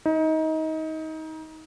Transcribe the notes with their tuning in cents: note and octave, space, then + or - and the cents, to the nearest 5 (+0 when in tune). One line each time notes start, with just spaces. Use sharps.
D#4 +25